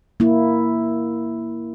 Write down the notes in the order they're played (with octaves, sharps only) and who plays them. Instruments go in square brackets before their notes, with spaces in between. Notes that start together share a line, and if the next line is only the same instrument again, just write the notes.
[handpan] A#3 E4